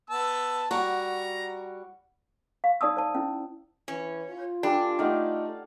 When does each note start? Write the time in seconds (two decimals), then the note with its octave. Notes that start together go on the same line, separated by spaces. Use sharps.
0.10 B3 A5 E6
0.71 G3 F#4 A#5
2.64 F5
2.81 D#4 D5 A5 D#6 E6
2.97 C5 A5
3.15 C#4 E4
3.88 E3 C#4
4.30 F4
4.63 G3 D4 A4 G#5
4.99 A3 D#4 D5 F5 F#5